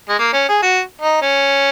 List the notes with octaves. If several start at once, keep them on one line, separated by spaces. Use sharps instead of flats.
G#3
A#3
C#4
G#4
F#4
D#4
C#4